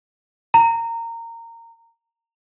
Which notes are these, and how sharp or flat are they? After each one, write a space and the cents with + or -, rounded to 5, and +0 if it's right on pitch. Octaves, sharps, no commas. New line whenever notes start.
A#5 -20